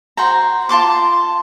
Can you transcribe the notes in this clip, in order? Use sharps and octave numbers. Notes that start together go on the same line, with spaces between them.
F#4 C5 G5 A#5
F4 A5 C6 D6